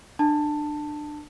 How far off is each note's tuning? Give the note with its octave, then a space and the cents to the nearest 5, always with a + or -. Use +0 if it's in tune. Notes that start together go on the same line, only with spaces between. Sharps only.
D4 +25 A5 +10